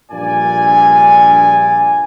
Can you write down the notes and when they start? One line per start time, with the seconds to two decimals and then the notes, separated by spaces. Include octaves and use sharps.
0.12 A#1 G2 A#2 D5 G#5